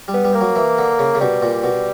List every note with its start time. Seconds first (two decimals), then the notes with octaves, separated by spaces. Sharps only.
0.08 G3
0.14 B3
0.24 G3
0.34 A#3
0.41 F#3
0.56 E3
0.78 D3
0.99 C#3
1.15 C#3
1.21 B2 G3
1.42 A#2
1.64 B2